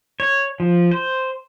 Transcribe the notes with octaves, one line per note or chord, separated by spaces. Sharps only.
C#5
F3
C5